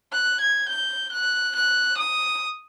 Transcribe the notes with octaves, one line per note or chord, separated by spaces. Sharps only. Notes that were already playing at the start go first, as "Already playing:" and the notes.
F#6
G#6
G6
F#6
F#6
D#6